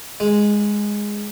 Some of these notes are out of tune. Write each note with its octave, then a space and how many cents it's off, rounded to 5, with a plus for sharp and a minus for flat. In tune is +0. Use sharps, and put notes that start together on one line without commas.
G#3 -5